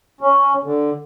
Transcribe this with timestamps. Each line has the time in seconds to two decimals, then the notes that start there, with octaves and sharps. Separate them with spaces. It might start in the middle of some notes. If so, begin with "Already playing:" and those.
0.21 C#4
0.64 D3